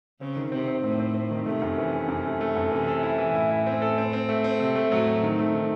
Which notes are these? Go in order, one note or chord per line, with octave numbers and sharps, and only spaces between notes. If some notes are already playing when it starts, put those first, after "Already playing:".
C#3 C4
D#3
C3 C4
C4
A2 C4
C4
C4
D#3
C3 A3
F#2
E3
E3
F#2
A3
A3
F#2
C3 E3
A4
E4
E3
A2 E4
E4
C4
A4
C4
C4
A3
C4
C3 A3
A3
A2 F#3
C4
D#3
A3
D#3